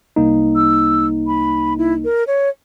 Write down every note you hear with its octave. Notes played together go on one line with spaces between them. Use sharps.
C2 A#3 D#4
E6
B5
E4
A#4
C#5